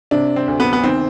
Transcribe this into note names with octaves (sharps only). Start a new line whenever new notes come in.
C3 D4
C4
D2
B3
B3
D#3 C4